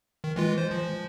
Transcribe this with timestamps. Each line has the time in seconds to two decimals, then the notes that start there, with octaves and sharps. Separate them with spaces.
0.24 D#3
0.36 E3 G#3 F4
0.58 C5
0.71 F3